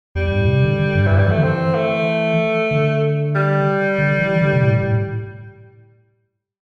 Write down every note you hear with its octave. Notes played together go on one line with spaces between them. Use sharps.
E2 G3
G2
A2
C3
D3
D3
G2
G2 E3
G3
E3 A3
D3
E3 C4
A3
D3
G3
D3
E3
D3
C3
A2
A2